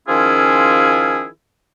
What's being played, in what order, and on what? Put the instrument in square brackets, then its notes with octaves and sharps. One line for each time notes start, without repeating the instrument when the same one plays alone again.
[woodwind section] D#3 F3 C#4 E4 F4 G#4